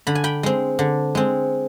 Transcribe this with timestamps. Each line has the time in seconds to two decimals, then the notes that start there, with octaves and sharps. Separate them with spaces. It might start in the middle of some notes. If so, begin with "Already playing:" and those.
0.07 D3 B5
0.15 G#5
0.24 G5 B5
0.43 G#3 C4
0.79 D3
1.15 G#3 C4